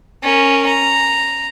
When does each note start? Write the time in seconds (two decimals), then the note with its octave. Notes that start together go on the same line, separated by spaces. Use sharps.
0.23 C#4 A#4
0.66 A#5